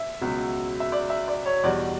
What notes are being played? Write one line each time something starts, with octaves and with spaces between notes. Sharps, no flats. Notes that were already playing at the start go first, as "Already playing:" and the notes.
Already playing: E5
C#2 B2 F#3
E5
D5
E5
D5
C#5
E2 B2 G3 D5